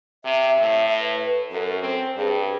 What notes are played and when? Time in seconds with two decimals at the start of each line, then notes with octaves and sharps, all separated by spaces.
0.25 C3 E5
0.58 A2
1.00 B4
1.51 F#2 A4
1.83 C4 C5
2.17 G2 G#4